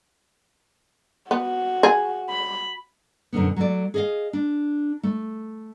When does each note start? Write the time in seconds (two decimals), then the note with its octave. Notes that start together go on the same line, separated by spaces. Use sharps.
1.31 B3 F#4
1.83 G#4
2.29 B5
3.33 F#2 B2 D3 B3
3.56 F#3 A3 D5
3.94 G#4 D#5 F5
4.33 D4
5.03 A3